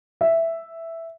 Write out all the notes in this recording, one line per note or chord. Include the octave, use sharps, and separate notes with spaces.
E5